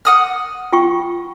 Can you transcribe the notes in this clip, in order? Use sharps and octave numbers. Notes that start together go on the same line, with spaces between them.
F#5 D#6 F6
F4 G5 C#6